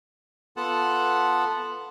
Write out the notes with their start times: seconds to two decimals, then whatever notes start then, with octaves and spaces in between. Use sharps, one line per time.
0.57 B3 F4 A4 F#5 A5